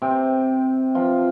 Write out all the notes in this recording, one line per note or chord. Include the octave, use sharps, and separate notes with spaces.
C3 C4
F3 F4